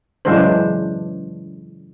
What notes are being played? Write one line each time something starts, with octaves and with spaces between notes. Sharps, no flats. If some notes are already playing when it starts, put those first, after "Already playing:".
C#3 E3 F#3 G#3 D4 C5